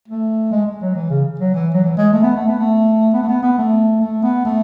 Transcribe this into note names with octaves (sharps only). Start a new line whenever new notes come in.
A3
G#3
G#3
F#3
E3
C#3
F#3
E3
F#3
E3
G#3
A3
B3
A3
B3
A3
B3
A3
B3
B3
A3
A3
B3
A3